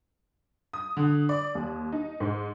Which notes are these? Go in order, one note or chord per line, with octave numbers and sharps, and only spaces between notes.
D#6
D3
D5
D#2
D#4
G#2